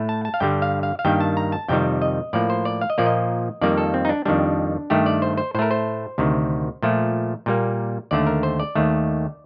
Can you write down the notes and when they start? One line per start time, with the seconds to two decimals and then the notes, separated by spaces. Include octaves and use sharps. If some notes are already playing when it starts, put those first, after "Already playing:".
Already playing: A2 A3
0.09 A5
0.25 A5
0.34 F5
0.40 G2 D3 G3 G5
0.62 F5
0.83 F5
0.99 F5
1.05 G2 D#3 G3 A#3 G5
1.20 A5
1.37 A#5
1.52 A5
1.68 F2 C3 D#3 G3 G5
2.02 D#5
2.33 A2 F3 A#3 D5
2.50 C5
2.65 D5
2.81 F5
2.90 D#5
2.98 A#2 F3 A#3 D5
3.06 D#5
3.61 F2 D#3 G3 A#3 D5
3.77 A4
3.94 C4
4.05 D#4
4.09 D4
4.25 F2 D#3 G3 D4
4.90 G2 D#3 A3 G4
5.06 D5
5.22 C5
5.37 C5
5.55 A2 C5
5.59 A3 A#4
5.71 C5
6.18 D2 C3 D#3
6.83 A#2 F3 A3
7.46 A#2 G3 A#3
8.11 D#2 D3 A3 D5
8.27 A#4
8.43 C5
8.60 D5
8.75 D#2 D#3 A3